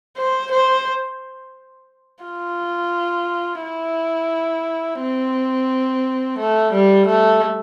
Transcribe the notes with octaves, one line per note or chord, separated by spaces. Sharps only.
C5
C5
F4
E4
C4
A3
G3
A3